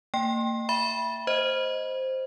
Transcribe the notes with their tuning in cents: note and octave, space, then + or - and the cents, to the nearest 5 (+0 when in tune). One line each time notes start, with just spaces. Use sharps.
A#3 -35 G5 +0
E5 +10 B5 -20
C5 +0 D#5 +0